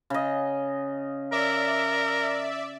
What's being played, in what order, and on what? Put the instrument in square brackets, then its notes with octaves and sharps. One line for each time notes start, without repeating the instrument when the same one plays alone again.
[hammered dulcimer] C#3 D#5
[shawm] A#4 [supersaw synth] D5 E5